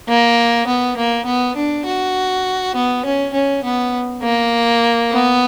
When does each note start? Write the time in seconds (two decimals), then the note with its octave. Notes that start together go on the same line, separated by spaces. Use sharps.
0.08 A#3
0.67 B3
0.97 A#3
1.26 B3
1.56 D4
1.86 F#4
2.75 B3
3.05 C#4
3.33 C#4
3.64 B3
4.23 A#3
5.12 B3